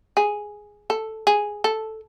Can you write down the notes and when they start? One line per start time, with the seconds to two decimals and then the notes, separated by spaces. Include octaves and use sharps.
0.17 G#4
0.90 A4
1.27 G#4
1.64 A4